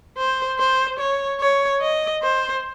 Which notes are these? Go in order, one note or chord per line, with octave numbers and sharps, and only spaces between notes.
C5
C5
C#5
C#5
D#5
C5